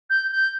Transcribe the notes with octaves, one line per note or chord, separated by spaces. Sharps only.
G6
G6